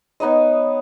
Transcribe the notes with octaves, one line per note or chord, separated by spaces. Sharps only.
B3 D#4 C#5 D#5